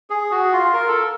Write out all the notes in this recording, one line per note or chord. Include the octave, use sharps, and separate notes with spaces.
G#4
F#4
F4
A#4
A4